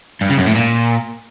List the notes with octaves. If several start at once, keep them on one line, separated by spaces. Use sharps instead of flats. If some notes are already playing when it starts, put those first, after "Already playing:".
G2
C#3
F#2
A2
A#2